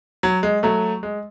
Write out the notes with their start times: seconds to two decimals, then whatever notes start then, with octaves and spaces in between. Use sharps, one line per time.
0.23 F#3
0.43 G#3
0.63 F#3 A3
1.03 G#3